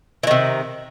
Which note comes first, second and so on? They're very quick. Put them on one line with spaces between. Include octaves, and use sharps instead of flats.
E3 D#3 C3